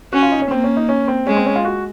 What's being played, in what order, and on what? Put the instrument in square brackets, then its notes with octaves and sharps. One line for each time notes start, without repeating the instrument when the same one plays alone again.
[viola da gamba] C#4 [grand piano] F#4
[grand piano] F4
D#4
C#4
[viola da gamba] A#3 [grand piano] C4
[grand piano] C#4
D#4
C#4
C4
[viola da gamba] G#3 [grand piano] C#4
[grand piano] C4
C#4
F4
F#4